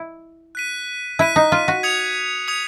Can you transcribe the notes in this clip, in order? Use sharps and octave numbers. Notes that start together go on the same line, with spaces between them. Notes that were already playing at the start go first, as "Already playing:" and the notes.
Already playing: E4
F#6 B6 D#7
E4 F#6 B6 D#7
D#4
F4
F#4
D#6 G#6 C#7 F7
D#6 G#6 C#7 F7